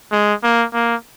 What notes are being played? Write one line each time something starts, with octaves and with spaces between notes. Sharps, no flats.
G#3
A#3
A#3